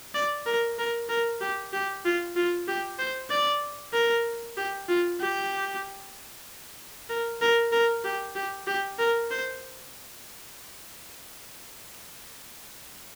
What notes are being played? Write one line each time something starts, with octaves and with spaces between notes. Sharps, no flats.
D5
A#4
A#4
A#4
G4
G4
F4
F4
G4
C5
D5
A#4
G4
F4
G4
A#4
A#4
A#4
G4
G4
G4
A#4
C5